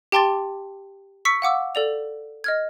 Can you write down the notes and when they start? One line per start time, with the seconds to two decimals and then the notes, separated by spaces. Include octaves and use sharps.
0.12 G4 G5 A5 C6 D6 A6
1.25 C#6 E6 B6 C#7
1.42 F5 F#5 D6 E6
1.75 A4 D5 F7
2.44 D#5 F6 G#6